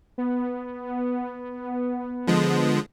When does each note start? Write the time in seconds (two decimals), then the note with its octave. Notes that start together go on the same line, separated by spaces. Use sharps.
0.18 B3
2.27 D3 F3 G#3